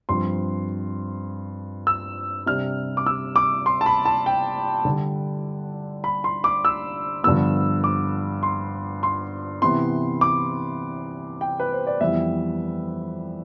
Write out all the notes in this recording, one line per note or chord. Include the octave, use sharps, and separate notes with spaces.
G2 F3 C4 C6
E6
C3 G3 D4 F6
D6
E6
D6
C6
A5
B5
A5
G5
D3 G3 D4
B5
C6
D6
E6
G2 D3 F3 B3 E6
D6
C6
C6
C3 E3 B3 C6
D6
G5
B4
C5
D5
F2 E3 G3 B3 E5